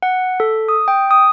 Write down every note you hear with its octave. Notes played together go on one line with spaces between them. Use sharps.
F#5
A4
D#6
G5
D#6